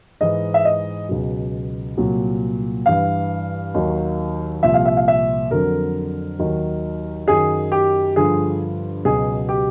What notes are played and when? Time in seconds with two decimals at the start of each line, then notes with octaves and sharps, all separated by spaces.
0.21 G#2 E3 D#5
0.54 E5
0.65 D#5
1.09 C#2 B2 F#3
1.98 C2 A#2 F#3
2.86 G2 E3 F5
3.74 D#2 D#3 F#3
4.63 C2 A#2 F3 E5
4.74 F5
4.86 E5
4.97 F5
5.08 E5
5.51 F2 D3 F#3 A#4
6.39 D#2 D#3 F#3
7.28 F#2 D#3 F#3 G#4
7.72 G4
8.16 G2 D3 F3 G#4
9.05 C#2 B2 F#3 G#4
9.49 G4